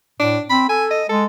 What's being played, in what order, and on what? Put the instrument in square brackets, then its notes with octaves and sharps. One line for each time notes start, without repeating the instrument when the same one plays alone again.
[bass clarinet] A2 [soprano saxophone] D4
[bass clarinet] C4 [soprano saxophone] B5
[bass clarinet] A4 [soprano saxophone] G#5
[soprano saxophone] D#5
[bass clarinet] G#3 [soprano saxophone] A4